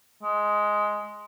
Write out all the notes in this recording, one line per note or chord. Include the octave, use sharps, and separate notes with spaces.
G#3